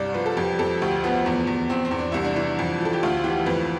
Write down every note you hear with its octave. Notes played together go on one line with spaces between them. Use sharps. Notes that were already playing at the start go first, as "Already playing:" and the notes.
Already playing: C2 G2 D5
F3 B4
A4
F2 G4
F2 A4
D2 G4
F3 B3
E2
E2
E2 C4
C4
E2
D4
C2 E4
D4
E3
F2
F3 A4
G4
D2 F4
E3 G4
F2 B4